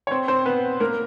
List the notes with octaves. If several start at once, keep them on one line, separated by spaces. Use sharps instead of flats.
C#5
C4 C5
C4 C5
B3 B4
A#3 A#4